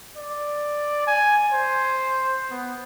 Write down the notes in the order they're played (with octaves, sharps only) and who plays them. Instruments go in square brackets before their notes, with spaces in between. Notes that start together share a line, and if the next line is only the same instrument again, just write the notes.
[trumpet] D5
G#5
C5
B3